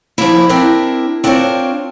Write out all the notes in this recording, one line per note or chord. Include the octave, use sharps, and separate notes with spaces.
F3 G3 A#3 E4
C4 D4 E4 G4 A#4
C4 D4 F4 A#4 C5 C#5